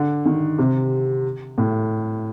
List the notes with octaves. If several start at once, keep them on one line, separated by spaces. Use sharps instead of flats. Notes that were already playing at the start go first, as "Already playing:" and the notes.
Already playing: D3
D#3
C3
A2